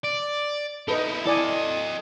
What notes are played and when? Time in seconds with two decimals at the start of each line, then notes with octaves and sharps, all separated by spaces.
0.04 D5
0.88 D#4 E4 A4 B4 D#5
1.25 E4 A4 D5 D#5 G#5